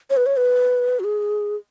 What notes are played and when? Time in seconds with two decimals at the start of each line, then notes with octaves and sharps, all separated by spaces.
0.10 C#5
0.17 B4
0.26 C#5
0.37 B4
1.00 F#4
1.04 G#4